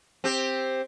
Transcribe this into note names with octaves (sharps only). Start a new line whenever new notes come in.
C4 G4